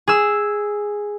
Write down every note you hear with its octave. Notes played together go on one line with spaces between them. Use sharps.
G#4 E6